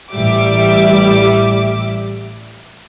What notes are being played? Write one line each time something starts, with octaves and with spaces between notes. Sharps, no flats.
A1 G3 E5 D6